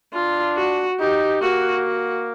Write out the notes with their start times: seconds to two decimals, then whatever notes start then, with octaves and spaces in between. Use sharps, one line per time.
0.14 D4 F4
0.57 F#4
0.99 D#4 G4
1.42 A#3 F#4
1.84 F#4